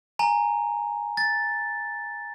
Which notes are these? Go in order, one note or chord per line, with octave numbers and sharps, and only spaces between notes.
G#5 A#5
A6